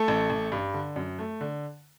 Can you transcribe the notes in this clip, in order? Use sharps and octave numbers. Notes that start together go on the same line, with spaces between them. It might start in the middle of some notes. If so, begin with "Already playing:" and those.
Already playing: A3 A4
A1
A1
G2
D3
F#2
A3
D3